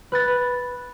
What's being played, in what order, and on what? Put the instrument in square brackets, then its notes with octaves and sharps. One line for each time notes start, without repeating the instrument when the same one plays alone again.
[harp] B4 F#6 A6